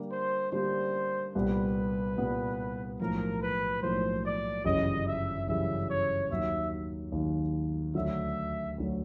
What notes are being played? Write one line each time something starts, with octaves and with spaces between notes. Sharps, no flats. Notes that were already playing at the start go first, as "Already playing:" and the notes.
Already playing: D3 G3 A#3 D4 G4
C5
D3 G3 A#3 D4 G4 C5
C2 A#2 G3 B3 B4
C2 A#2 G3 B3
B1 A2 F3 A#3 A#4
B4
B1 A2 F3 A#3 C5
D5
G1 F#2 C#3 E3 G3 D#5
E5
G1 F#2 C#3 E3 G3 E5
C#5
D#2 D#3 F#3 E5
D#2 D#3 F#3
D2 D3 F#3 E5
D2 D3 F#3